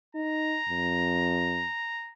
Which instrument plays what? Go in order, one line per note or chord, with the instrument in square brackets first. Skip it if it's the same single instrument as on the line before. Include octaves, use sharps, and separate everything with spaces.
[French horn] D#4 [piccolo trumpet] A#5
[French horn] F2